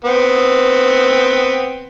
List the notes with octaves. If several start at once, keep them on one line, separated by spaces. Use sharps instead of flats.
B3 C4